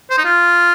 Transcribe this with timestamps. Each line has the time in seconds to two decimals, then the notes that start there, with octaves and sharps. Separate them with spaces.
0.10 C5
0.18 D#4
0.25 F4